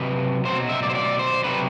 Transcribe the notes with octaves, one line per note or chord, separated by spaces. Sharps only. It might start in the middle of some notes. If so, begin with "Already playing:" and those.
Already playing: C3 F#3 B4
B2 F#3 C5
E5
D5
C5
D5
C5
C3 F#3 B4